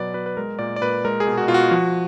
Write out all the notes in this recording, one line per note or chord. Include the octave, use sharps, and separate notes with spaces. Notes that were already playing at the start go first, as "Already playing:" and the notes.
Already playing: B2 F#3 B4 D5
B2 B4
B4
G#3 A#4
A#2 D5
D5
A#2 B4
G#3 A#4
G#4
B2
F#4
B2 F4
F#4
F3